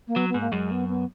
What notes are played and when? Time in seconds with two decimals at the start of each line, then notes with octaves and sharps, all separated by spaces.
0.08 A#3
0.16 F#3 B3
0.29 B3
0.34 G#2
0.41 A#3
0.52 F#2 G#3
0.71 B3
0.89 B3